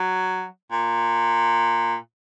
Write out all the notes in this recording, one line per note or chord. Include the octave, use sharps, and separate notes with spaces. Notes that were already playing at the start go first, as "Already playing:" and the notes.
Already playing: F#3
A#2